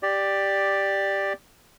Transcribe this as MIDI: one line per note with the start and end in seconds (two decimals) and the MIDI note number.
0.03 1.33 67
0.03 1.33 74